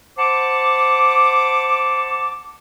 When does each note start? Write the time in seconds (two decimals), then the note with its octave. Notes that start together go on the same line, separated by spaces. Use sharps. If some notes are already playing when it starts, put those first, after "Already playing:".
0.18 C5 F#5 A5 D6